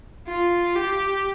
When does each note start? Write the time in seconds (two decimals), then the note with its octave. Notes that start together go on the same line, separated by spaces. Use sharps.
0.27 F4
0.75 G4